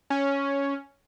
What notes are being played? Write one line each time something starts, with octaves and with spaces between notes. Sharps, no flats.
C#4